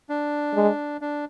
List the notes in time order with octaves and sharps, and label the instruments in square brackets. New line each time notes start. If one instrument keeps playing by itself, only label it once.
[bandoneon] D4
[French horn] G#3
[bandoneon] D4